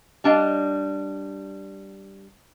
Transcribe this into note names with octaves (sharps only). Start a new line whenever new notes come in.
G3 D4 D#5 F5